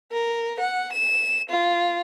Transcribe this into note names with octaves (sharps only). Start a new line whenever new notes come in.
A#4
F#5
E7
F4